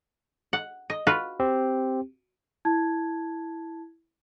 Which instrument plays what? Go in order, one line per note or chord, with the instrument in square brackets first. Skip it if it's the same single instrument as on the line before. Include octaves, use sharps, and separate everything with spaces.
[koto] F#5
D#5
F4 F#4 B4
[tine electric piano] C4 G4
[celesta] E4 A5 G#6